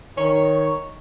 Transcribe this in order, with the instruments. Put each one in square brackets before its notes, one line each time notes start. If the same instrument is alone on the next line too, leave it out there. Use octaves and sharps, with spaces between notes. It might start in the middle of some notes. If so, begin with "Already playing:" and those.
[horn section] D#3 C#5